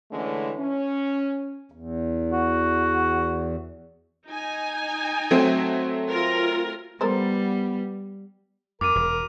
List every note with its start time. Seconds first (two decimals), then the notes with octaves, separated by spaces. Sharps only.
0.11 D3 E3 G#3 A3 C#4
0.57 C#4
1.72 E2
2.33 F#4
4.27 D#4 G#5
5.31 F#3 A3 C4
6.11 F4 A#4
7.01 G3 B3 A4 A#4 C5
8.81 F2 A#4 D6 D#7
8.95 E1